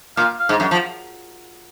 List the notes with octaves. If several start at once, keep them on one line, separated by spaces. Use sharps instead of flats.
A#2 F5
F5
G#2
F#2
F3